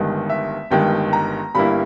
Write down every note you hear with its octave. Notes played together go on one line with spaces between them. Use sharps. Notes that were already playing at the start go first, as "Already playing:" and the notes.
Already playing: G1 G2 D#3 G#3
E5
G1 G2 D#3 G#3 G5
A#5
G1 G2 G3 A#3 E4 B5